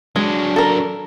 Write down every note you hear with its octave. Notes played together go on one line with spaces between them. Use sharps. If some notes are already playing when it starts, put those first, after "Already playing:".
F#3 G#3 D4
A4 A#4